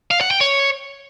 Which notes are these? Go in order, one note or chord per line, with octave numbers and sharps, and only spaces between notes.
F5
F#5
G5
C#5